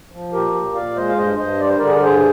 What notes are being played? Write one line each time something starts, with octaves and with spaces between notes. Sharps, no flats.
F3
A#2 G4 A#4
A#2
A#2 D5 F5
G#3 C5 D#5
F5
G2 C5 D#5
G2 C5 D#5
G3 D5
C5
D3 A#4 D5
G#4
A#4
G2 G#4 C5